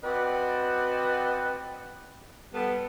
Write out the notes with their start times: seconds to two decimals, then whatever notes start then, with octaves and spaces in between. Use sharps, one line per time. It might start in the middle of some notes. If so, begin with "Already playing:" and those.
0.03 C4 F#4 B4 D5 D#5 F#5
2.54 G3 B3 A4